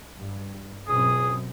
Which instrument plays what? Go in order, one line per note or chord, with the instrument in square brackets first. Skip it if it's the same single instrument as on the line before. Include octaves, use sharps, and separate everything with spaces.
[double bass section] G2
[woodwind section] C#2 G#4 D#6 [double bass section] F#2 B2 C4